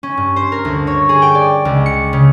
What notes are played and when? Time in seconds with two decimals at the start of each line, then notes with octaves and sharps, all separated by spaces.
0.03 C#4
0.17 G2
0.36 C5
0.52 A#4
0.65 D2
0.87 C#5
1.09 G#4
1.22 G5
1.35 D5
1.65 C#2
1.86 C#7
2.13 C#3